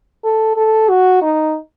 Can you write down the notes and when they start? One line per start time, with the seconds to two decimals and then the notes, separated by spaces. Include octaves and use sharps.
0.24 A4
0.56 A4
0.89 F#4
1.22 D#4